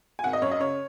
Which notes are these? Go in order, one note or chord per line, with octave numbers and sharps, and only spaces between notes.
G#5
G#1 F#5
D#5
F#2 C#5
D#5
C#3 C#5